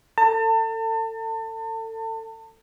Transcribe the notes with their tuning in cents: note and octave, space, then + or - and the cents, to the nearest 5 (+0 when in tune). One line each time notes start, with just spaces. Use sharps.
A4 +30 A5 +35